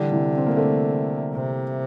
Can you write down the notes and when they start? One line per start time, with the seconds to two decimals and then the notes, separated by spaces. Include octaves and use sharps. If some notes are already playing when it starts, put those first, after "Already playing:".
Already playing: D3 E3 G3
0.12 C3 E3
0.37 C4
0.46 A#3
0.56 A3 C4
1.34 C3